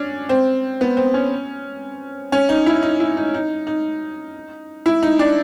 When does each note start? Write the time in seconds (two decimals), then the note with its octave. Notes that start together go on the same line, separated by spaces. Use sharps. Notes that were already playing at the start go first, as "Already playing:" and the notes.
Already playing: C#4 D4
0.29 C4
0.81 B3
0.97 C4
1.14 C#4
2.32 C#4
2.49 D#4
2.66 E4
2.82 D#4
3.00 E4
3.17 D#4
3.34 D#4
3.67 D#4
4.86 E4
5.03 D#4
5.19 D4